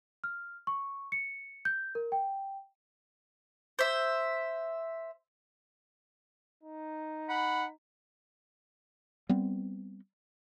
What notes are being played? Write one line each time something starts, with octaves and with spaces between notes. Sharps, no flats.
F6
C#6
C#7
G6
A#4
G5
C5 E5
D#4
F#5 B5
G3 B3 C4